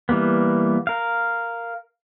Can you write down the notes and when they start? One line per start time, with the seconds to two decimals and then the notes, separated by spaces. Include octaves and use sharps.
0.09 E3 G3 A#3 B3
0.87 A#4 F5